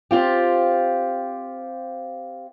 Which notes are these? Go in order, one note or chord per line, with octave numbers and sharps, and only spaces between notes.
C4 F4 G4